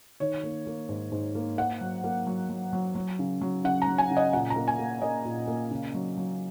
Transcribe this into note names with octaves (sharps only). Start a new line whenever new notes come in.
D#3 C#5
A#3
A#3
G#2
G#2
A#3
A#3 F#5
F#3
A#3
F#3
F#3
F#3
F#3
C#3
F#3
C#3 F#5
A#5
F#3
G#5
C#3
D#5
A#2 F#5
A#5
A#3
G#5
A#3
A#3 D#5
A#2
A#3
C#3
F#3
F#3